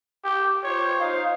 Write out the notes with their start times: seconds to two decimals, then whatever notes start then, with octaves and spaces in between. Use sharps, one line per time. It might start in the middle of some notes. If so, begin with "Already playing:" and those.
0.24 G4
0.64 F4 C5 C#5
1.00 D#4 F5